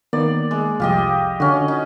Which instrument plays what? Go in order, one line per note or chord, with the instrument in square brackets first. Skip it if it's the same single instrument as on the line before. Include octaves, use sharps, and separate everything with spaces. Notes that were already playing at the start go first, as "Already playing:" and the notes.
[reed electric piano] D#3 A#3 B3 [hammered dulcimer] D5
[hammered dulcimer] G#3
[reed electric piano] C2 F2 [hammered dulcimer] F4 G4 D#5
[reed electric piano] D3 [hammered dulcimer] C#4 F#4
[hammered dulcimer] D#4